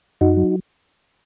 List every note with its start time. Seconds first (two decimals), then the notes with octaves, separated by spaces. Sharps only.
0.21 F#2 D#4 F#4
0.37 F#3